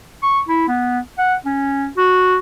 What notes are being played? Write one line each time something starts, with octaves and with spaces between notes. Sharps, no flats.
C#6
E4
B3
F#5
C#4
F#4